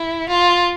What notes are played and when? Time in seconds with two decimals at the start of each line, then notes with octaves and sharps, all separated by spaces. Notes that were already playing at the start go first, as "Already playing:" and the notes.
Already playing: E4
0.29 F4